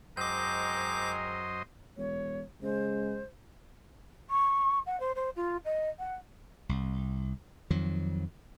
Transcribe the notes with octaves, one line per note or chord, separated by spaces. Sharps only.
F#2 G#3 C4 A#4 C5 D#5 D6 G6
E1 C#5
C#3 G#3 C5
C#6
F#5
C5
C5
F4
D#5
F#5
C2
F2 D#3 F3 F#3